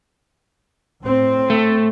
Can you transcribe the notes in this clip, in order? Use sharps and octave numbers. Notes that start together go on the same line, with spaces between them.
A2 C4
A3